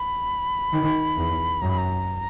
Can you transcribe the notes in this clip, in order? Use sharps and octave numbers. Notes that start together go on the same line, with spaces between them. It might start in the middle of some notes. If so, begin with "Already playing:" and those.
Already playing: B5
D#3
E2
F#2 A#5
B5
A#5